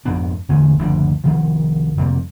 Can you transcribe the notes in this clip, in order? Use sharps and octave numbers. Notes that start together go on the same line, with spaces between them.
F2 G#2 B3 D4
E2 D3 A3 C#4
F#1 D2 F3 D4
C2 C3 D#3 F3
F2 C3 G3 A#3